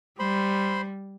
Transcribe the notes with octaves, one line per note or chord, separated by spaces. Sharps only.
G3 C5 B5 C6